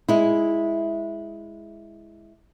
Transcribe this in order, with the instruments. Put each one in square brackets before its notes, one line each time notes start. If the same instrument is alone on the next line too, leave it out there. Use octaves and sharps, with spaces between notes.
[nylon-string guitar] G#3 E4